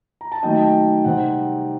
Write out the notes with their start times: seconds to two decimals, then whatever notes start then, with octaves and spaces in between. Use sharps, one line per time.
0.21 A#5
0.32 A5
0.43 D#3 F#3 A3 D#4 D#5 G5
0.55 A5
0.59 D#5 G5
1.05 C3 G3 C4 D#4 F#5